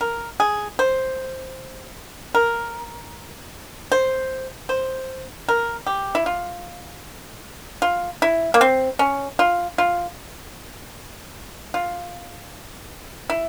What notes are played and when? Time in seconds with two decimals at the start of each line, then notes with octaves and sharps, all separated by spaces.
0.01 A#4
0.40 G#4
0.79 C5
2.35 A#4
3.92 C5
4.69 C5
5.49 A#4
5.87 G4
6.15 E4
6.26 F4
7.82 F4
8.22 E4
8.54 A#3
8.61 C4
8.99 C#4
9.39 F4
9.78 F4
11.74 F4
13.30 E4